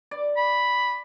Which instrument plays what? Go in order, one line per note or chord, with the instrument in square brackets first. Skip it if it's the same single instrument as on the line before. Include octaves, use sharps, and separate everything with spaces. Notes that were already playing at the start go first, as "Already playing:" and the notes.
[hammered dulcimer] D5
[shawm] B5